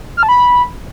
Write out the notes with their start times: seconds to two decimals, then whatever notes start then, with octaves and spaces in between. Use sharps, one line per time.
0.17 F6
0.23 A5
0.29 B5